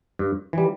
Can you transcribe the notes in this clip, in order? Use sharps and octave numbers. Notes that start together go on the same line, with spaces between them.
G2
E3 G3